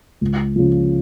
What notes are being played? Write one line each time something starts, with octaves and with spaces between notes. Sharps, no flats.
C#2
C#3 F3